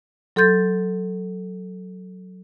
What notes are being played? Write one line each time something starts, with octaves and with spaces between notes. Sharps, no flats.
F#3 A4 C6 G6 A6